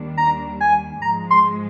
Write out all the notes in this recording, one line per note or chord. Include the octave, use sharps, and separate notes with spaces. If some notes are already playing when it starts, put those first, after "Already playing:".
Already playing: D#2 D#3 G3 D4
A#5
G#5
G#2 F3 G#3 A#5
C6